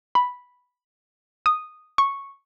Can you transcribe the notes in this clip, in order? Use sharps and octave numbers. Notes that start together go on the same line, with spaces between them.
B5
D#6
C#6